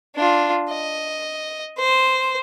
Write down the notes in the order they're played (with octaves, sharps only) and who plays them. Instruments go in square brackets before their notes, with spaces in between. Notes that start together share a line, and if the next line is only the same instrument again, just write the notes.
[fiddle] D4 F4
D#5
C5